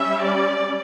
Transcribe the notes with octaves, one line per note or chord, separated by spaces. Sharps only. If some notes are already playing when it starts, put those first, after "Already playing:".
Already playing: G3 C#4 E5
D5